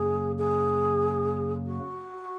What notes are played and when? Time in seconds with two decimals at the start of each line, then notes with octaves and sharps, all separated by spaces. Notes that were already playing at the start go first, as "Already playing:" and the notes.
Already playing: F#2 C#3 F#3 A#3 G#4
0.39 G#4
1.66 F#4